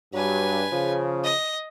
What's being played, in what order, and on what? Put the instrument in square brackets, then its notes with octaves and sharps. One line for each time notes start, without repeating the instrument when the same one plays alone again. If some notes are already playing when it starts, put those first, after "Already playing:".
[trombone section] G2 [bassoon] F#3 [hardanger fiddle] B4 G#5
[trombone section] C#3 [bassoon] F3
[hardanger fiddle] D#5